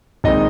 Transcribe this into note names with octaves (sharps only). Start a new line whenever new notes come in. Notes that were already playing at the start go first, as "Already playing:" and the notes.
A#1 D#3 G#3 C4 D#4 D#5